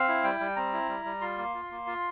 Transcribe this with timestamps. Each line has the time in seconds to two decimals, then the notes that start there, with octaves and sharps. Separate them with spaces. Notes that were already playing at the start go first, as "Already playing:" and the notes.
Already playing: C4 F5
0.08 E4
0.24 G3 G5
0.40 G3
0.56 C4 A#5
0.73 E4
0.89 G3
1.05 G3
1.21 F4 C6
1.38 A#3
1.54 F4
1.71 A#3
1.87 F4